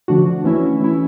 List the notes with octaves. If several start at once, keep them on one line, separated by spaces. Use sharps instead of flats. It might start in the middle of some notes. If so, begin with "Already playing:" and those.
D3 F3 A3 D4 F#4
E3 A3 C#4 E4
E3 A3 C#4 E4